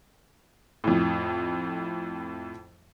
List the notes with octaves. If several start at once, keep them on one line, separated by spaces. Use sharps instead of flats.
F2 A2